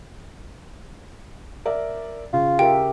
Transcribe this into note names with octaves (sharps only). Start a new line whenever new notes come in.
A#4 D5 E5
C#3 F4
G4 A#4 E5 G5